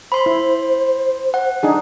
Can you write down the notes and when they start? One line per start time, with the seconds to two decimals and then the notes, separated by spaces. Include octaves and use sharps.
0.12 C5 B5 C6
0.26 E4
1.34 F#5
1.63 D4 D#4 G#4